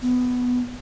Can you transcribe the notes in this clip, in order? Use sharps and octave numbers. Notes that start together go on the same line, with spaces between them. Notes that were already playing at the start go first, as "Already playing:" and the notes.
B3